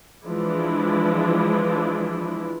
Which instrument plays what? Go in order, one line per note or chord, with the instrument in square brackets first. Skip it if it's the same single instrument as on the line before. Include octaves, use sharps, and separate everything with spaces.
[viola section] E3 F3 G#3 D4 E4